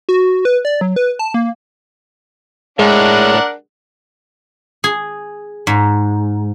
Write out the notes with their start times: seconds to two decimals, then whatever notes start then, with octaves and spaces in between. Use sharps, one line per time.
0.09 F#4
0.45 B4
0.65 D5
0.81 F#3
0.96 B4
1.19 A5
1.34 A#3
2.79 A2 G#3 D4 A#4 F#5
4.84 G#4
5.67 G#2